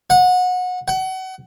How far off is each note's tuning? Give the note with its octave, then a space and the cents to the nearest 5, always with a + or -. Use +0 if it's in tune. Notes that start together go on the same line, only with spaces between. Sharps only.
F#5 -25
F#5 +30